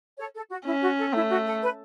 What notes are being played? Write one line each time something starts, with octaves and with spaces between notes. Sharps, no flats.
A4 C#5
A4
F#4
C#4 E4
F#4
A4
A3 E4
F#4
A4
B4